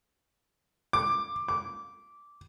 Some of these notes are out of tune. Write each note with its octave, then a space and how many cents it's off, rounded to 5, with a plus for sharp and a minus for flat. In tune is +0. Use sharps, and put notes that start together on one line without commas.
D6 +15
D6 -10